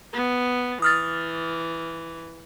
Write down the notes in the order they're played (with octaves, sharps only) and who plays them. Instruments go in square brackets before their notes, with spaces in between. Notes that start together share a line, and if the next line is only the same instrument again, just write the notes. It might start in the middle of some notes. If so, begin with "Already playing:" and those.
[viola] B3
[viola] E3 [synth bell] D#6 F6 A6